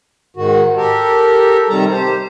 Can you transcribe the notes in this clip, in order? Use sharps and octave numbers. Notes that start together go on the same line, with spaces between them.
G#2 D#3 F#4
G4 A4 A#4
C3 D#3 G3 A5 A#5
G4 C5